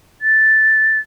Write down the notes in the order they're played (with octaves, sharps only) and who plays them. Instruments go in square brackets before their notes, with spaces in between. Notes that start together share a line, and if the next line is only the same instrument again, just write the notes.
[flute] A6